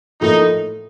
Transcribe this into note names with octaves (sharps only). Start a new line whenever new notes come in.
A2 F3 A#3 D#4 F4 A4